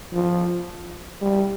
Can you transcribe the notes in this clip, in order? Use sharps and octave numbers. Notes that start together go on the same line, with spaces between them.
F3
G3